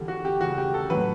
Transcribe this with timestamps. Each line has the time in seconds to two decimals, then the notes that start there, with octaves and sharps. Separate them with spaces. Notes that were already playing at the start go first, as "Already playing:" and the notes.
Already playing: E2 D3 G3
0.08 F#4
0.25 G4
0.41 E1 D2 C#3 F#4
0.58 G4
0.74 A4
0.90 A2 F#3 B4